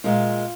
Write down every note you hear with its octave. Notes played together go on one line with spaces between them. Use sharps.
A#2 G#3 F4